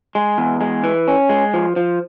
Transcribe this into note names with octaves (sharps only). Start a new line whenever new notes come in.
G#3
E2
G#3
E3
C#4
G#3
F3
F3